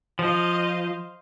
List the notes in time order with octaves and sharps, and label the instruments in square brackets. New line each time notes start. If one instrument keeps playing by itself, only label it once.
[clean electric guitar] F3 [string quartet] C5 D#5 F5